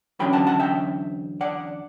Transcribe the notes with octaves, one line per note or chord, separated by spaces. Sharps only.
E2 D3 F#3 C#4 G5 B5
F#5 A5
F#5 A5
E5 G5
D5 F#5